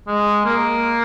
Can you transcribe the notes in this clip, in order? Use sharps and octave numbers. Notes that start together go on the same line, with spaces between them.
G#3
A#3